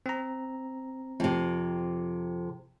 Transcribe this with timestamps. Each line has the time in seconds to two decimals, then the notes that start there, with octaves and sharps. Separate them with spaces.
0.06 C4 A#5
1.20 F2 C3